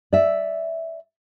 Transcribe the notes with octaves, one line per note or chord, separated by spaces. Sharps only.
D5 E5